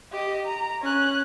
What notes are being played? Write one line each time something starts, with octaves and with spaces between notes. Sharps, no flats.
G4 D#5
A#5
C#4 F#6